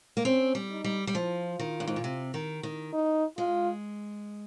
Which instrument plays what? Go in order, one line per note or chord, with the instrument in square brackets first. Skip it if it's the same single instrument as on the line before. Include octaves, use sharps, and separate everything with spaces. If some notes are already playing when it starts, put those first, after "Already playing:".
[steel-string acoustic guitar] A#3
[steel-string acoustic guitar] C4 [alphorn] C#4
[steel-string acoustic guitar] G3
[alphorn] D#4
[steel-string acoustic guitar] G3
G3
[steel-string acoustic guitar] F3 [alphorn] F4
[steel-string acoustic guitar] D#3
G2
G#2
A#2
C3
D#3
D#3
[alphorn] D#4
[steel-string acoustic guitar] G#3 [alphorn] F4